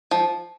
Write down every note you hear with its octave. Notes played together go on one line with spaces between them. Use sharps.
F3